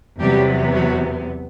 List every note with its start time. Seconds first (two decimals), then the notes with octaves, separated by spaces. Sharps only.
0.19 E2 C3 F#3 G3 B3 G4
0.73 F#3 F#4